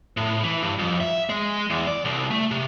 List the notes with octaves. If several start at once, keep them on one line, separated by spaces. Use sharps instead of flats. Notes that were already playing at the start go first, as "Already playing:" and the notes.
A2
E3
G2
F2
E5
G#3
E2
D5
C2
A3
C3